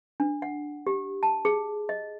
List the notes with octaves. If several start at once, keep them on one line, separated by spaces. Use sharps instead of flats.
D4
F#5
G4
A5
G#4
D#5